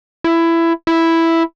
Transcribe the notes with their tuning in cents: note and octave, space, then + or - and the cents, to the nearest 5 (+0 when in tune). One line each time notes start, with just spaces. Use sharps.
E4 +15
E4 +0